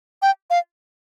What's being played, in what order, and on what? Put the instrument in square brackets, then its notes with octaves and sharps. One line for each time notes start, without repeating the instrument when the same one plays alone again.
[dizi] G5
F5